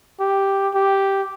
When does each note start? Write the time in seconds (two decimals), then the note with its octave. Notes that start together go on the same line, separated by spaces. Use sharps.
0.20 G4
0.74 G4